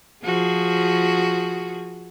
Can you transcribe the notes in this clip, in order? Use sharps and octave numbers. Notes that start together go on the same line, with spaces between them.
F3 F#4 G#4